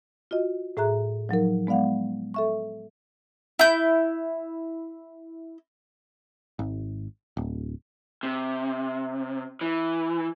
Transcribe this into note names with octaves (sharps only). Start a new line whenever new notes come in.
F4 F#4 D#5
A2 G#4 E5 A#5 F#6
F3 F#3 D#4 A#4
G#3 B3 D5 F5 F#5
A4 E5 C#6
E4 G6
G#1
D1
C3
E3